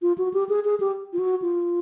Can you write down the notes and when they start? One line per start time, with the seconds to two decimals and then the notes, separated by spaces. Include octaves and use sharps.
0.02 F4
0.18 F#4
0.34 G4
0.49 G#4
0.65 G#4
0.80 G4
1.13 F4
1.19 F#4
1.42 F4